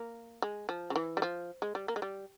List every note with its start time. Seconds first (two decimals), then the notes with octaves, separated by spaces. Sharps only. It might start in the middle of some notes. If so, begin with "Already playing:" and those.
Already playing: A#3
0.42 G#3
0.69 F3
0.90 C#3
0.96 E3
1.17 G3
1.22 F3
1.62 G#3
1.75 G3
1.88 A#3
1.96 G#3
2.02 G3